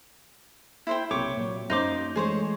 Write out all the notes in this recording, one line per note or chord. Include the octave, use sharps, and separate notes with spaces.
E4 C5 G5
B1 C3 A#3 C#5 G5 D6
A#2 F#3
F#2 A#3 C#4 D#4 C5 D6
E3 G#3 A3 G#4 C5 C#5